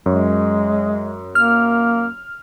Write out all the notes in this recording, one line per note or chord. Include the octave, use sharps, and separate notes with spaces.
F#2 G#3 C#5
A#3 F6